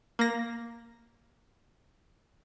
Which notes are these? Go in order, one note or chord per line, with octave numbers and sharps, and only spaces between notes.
A#3 A#6